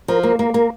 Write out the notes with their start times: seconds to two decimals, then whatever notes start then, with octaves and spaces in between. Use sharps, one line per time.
0.08 F3 A#4
0.23 A#3 A#4
0.39 A#3 A#4
0.54 A#3 A#4